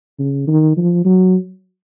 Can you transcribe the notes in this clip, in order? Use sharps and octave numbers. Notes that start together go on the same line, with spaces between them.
C#3
D#3
F3
F#3